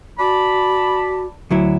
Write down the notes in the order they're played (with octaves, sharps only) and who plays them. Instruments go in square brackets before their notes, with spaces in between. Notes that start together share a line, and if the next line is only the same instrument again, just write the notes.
[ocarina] F#4 [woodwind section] D5 A5 B5
[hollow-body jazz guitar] D2 F#3 E4